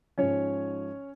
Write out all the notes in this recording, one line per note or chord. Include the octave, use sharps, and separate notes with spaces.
G#2 F3 C#4 C#5